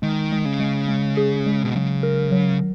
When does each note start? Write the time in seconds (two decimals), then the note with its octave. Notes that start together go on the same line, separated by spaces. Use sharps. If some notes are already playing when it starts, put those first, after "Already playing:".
0.02 D#3 G#3
0.32 G#3
0.45 C#3
0.60 G#3
0.88 G#3
1.17 G#4
1.46 G#3
1.63 B2
1.75 C#3 F#3
2.03 A#4
2.32 F#3